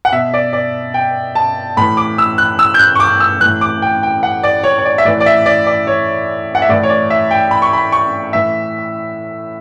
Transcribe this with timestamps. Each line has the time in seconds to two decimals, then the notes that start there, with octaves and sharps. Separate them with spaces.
0.05 F#5
0.12 B2 E5
0.34 D5
0.53 D5
0.94 G5
1.35 A5
1.77 A2 E3 B5
1.97 D6
2.18 E6
2.38 F#6
2.59 E6
2.74 G6
2.79 F#6
2.95 C#6
3.00 D6
3.20 E6
3.41 A2 E3 F#6
3.61 D6
3.82 G5
4.03 G5
4.23 F#5
4.43 D5
4.64 C#5
4.78 C#5
4.85 D5
4.98 E5
5.05 A2 E3 D5
5.20 D5
5.26 E5
5.46 D5
5.67 D5
5.87 C#5
6.55 F#5
6.62 E5
6.69 A2 E3 D5
6.83 C#5
6.90 D5
7.10 E5
7.31 G5
7.51 B5
7.62 C#6
7.73 B5
7.92 C#6
8.33 A2 E3 E5